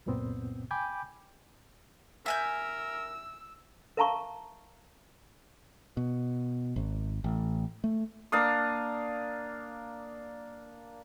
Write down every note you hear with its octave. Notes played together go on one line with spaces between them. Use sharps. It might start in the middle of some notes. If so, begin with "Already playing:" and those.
C#2 F#2 A#2 B3 C4
G5 G#5 B5 D6 G6
A#4 E5 G#5 E6 G6
A#4 E5 F5 A5 A#5 C#6
B2
G#1
A1
A3
A#3 D4 F5 D#6